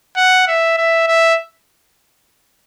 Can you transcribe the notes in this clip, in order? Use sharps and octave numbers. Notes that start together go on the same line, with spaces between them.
F#5
E5
E5
E5